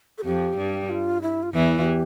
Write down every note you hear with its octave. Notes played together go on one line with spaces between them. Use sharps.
A4
F2 F3 G4
G2 G3
F4
E4
F4
E2 E3 E4
G4